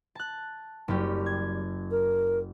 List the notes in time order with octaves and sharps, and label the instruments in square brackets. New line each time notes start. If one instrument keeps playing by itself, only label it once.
[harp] A5 F#6
[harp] F#1 C#4 G4 [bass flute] G3
[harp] G#6
[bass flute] A#4